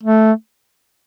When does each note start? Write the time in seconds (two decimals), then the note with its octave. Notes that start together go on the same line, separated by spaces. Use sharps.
0.03 A3